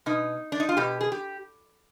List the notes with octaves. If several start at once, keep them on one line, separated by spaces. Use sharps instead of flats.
B2 D#4
D4
D#4
F4
B2 G4
G#4
G4